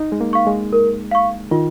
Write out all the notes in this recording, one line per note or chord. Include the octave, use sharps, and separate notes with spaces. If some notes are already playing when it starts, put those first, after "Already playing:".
Already playing: D#4
G#3
A#3
F5 C#6
G#3
A#4
F5 C#6
D#3 F4